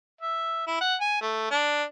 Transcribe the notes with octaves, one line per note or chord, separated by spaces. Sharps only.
E5
E4
F#5
G#5
A3
D4